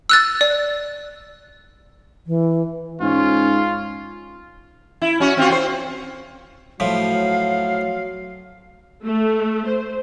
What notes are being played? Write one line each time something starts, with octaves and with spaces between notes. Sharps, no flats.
E6 F#6 A6
D5
E3
G#2 C#4 F4
E4
C#4 F#4
C4 F4 F#4
C4 C5
A2 F3 F#3 F5
A3
C5